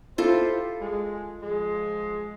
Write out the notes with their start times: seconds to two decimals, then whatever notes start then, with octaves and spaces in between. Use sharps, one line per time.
0.18 E4 F4 G4 A4 C5
0.82 G#3
1.43 F3 G#3